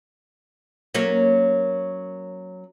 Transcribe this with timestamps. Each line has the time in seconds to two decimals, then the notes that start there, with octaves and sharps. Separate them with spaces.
0.94 F#3 A#3 C#4